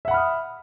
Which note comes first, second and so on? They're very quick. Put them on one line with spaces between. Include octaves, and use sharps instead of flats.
E5 F#5 B5 F6 D#6